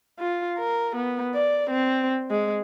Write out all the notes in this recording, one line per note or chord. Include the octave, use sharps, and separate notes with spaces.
F4
A#4
B3
D5
C4
G#3